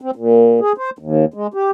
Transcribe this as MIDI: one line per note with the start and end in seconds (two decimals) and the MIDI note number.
0.01 0.11 60
0.16 0.60 46
0.60 0.73 68
0.78 0.90 72
0.99 1.25 39
1.34 1.47 56
1.54 1.71 67